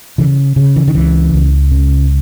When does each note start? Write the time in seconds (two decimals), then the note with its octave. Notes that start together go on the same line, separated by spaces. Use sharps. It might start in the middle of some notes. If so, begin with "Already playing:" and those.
0.18 C#3 E3
0.56 C#3
0.76 E3
0.88 D#3
0.95 C#2 E3
1.33 C#2
1.71 C#3